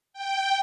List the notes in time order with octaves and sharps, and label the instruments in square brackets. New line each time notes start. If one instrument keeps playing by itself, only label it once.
[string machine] G5